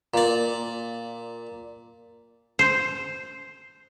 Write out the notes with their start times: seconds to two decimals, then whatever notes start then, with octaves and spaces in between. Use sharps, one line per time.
0.14 A#2 D5
2.59 C5